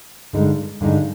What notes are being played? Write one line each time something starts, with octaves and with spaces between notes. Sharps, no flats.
G2 D3 G#3 D#4
G2 D3 G#3 D#4